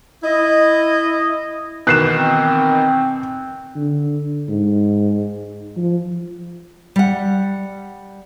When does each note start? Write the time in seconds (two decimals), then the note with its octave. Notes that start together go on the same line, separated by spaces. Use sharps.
0.24 E4 D#5
1.87 B2 D#3 E3 F#6 C7 E7
2.15 C4
3.76 D3
4.49 G#2
5.77 F3
6.96 G3 F#5